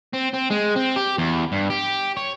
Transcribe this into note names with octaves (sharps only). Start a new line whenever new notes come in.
C4
C4
G#3
C4
G4
E2
G2
G4
C#5